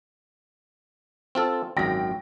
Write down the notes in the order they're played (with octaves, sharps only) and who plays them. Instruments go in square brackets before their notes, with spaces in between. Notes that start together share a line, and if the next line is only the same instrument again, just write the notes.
[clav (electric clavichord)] C4 F4 A4
[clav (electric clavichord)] G#1 F#2 [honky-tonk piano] G5 A#6